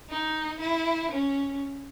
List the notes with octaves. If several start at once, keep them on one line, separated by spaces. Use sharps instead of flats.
D#4
E4
C#4